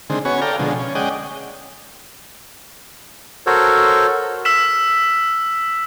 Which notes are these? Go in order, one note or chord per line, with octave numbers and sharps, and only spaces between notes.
D3 D#3 G#3 C4
B3 C#4 F#4 C#5 G#5
A4 D5 F5 G5 A#5
B2 D3 F3 G#3
C#4
G#3 C#4 D5 D#5 F#5 G5
F#4 A4 A#4 C5 C#5
E6 F6 B6 E7